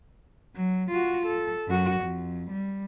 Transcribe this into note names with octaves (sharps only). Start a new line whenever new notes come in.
F#3
F4 F#4
A4
F#2 F#4
F2
G3